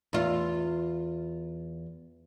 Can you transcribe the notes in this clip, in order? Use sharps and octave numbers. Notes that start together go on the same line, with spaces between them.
E2 F4